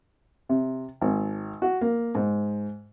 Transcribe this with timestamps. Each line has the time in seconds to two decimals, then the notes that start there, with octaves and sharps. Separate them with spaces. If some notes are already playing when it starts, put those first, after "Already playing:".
0.49 C3
1.01 G#1
1.62 F#4
1.81 A#3
2.15 G#2